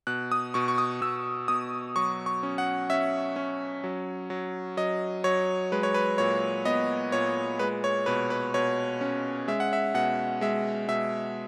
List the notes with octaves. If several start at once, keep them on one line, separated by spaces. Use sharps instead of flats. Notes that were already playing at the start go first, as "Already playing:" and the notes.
B2 F#6
D#6
B2 C#6
C#6
D#6
B2 E6
B2 D#6
F#3 C#6
C#6
C#4
F#5
C#4 E5
C#4
F#3
F#3
F#3 D#5
F#3 C#5
G#3 B4
C#5
B4
A#2 C#5
B3 D#5
A#2 C#5
G#3 B4
C#5
B2 B4
B4
B2 C#5
C#4
G#3 E5
F#5
E5
B2 F#5
G#3 E5
B2 E5